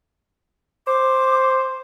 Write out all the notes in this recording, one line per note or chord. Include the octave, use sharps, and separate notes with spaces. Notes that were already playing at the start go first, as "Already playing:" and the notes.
C5 D6